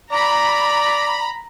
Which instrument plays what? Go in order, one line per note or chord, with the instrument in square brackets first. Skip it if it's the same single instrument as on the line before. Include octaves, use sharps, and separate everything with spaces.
[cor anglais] D5 [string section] A#5 B5